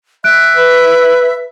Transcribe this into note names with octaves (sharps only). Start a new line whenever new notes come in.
E5 F#6 D7
B4